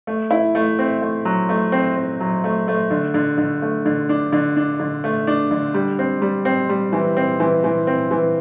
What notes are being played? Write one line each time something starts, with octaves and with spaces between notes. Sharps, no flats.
A3
E4
A3
C4
A3
F#3
A3
C4
C4
F#3
A3
A3
D3
D3
D3
A3
D3
D4
D3
D4
D3
A3
D4
D3
G3
C4
G3
C4
G3
E3
C4
E3
E3
C4
E3